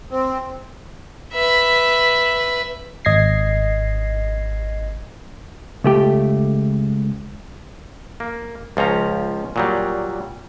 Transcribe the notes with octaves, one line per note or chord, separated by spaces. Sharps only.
C4
B4 E5
G#1 D#5 G#6 A#6 C7
C#2 A3 G4
A#3
C#2 F3 C#4 A#5
A#2 F#3 G3